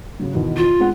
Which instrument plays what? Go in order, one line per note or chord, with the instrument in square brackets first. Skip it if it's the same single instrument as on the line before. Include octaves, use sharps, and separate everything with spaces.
[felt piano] C#3 F#3
E2 B2 D#3
[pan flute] F4
[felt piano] G#3 C4 F#5